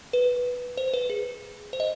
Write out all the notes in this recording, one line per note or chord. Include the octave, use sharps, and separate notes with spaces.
B4
C5
B4
G#4
C5
D#5